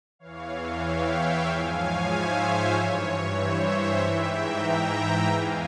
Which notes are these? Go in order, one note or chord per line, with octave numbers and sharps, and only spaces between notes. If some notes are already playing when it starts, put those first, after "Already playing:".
E2 E3 C#5 F5
C#5 F5
E5 G5
G#2 F3 F5 G#5
C#5 F5
C5 E5
C#5
G2 E3 C#5
C#5
C5 E5
G#2 E3 E5 G5
G5 A#5
E2 E3 F5 G#5